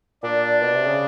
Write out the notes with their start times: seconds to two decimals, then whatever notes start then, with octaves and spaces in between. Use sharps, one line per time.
0.23 A#2 D4
0.62 B2
0.74 C3
0.86 C#3